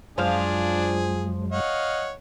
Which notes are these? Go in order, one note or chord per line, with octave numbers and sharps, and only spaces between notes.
F#2 F3 F#3 G#3 D4 G#4 F5
C#5 D#5 F5 F#5